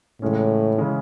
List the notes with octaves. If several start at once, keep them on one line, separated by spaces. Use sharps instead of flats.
A2 C#3 E3 G#3 C#4
C#3 E3 G#3 C#4